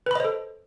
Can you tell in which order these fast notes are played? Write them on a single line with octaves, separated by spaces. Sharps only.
B4 B5 D#5 C5 A4